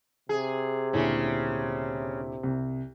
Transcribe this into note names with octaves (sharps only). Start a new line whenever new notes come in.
C3 G#4
D2 A#2 C#3 C#4 E4
C2